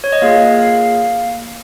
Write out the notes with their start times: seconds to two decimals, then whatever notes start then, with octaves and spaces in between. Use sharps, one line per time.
0.04 C#5
0.12 D#5
0.22 A#3 F4 G#4 F5
0.59 F5